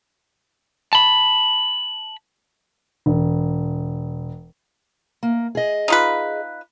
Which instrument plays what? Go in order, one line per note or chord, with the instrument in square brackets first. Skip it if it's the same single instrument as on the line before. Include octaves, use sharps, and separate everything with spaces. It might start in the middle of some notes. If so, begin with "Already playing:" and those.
[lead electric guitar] A5 B5
[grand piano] E1
[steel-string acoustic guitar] A#3
G#4 D#5
[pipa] D#4 F4 B4